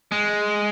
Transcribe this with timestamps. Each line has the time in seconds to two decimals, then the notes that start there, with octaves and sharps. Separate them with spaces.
0.12 G#3